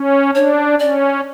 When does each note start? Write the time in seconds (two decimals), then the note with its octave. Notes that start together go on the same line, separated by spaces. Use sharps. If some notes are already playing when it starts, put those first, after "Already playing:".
Already playing: C#4
0.35 D4 C#5
0.80 C#4 D5